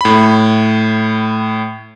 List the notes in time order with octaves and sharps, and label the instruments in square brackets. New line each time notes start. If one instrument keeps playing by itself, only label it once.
[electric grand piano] A2 B5